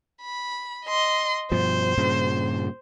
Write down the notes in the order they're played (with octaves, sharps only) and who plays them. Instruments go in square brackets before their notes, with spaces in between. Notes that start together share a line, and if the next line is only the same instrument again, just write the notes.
[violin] B5
D#5 C6
[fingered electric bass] G2 B2 F3 [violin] C5
[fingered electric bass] G2 A#2 C#3